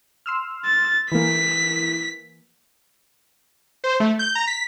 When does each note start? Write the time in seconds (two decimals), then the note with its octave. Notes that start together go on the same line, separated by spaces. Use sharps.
0.26 C6 E6 F6
0.66 A6
1.12 E3 A#3 B6
3.84 C5
4.00 A3
4.19 G6
4.35 A#5
4.47 B6